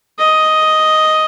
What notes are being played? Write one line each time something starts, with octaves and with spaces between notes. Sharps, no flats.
D#5